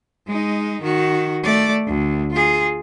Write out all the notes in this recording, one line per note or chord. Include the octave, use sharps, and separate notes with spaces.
G#3 D#4
D#3 F#4
A3 D5
D2
F4 G#4